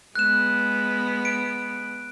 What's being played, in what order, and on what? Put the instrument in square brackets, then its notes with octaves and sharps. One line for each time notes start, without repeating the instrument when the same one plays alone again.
[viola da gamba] G#3 B3 [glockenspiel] F#6 E7
[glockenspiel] D7